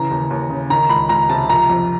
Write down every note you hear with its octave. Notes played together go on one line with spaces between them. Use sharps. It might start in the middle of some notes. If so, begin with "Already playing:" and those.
Already playing: C#3 E3 A#5
D#2
D#2
C#3
D#3 A#5
C#2 B5
C#2 A#5
C3 A5
F3 A#5
F2